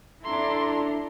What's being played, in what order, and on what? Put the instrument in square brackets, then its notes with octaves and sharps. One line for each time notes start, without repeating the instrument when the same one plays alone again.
[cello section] D4 E4 [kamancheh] A4 A#5 [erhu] C6